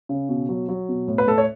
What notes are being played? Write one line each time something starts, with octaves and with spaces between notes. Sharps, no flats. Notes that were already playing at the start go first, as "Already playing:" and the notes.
C#3
B2
F#3
F#3
B2
A2
B4
A2 A4
C#5